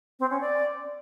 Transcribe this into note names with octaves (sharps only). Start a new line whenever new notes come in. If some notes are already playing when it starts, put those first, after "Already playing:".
C4
C#4
D5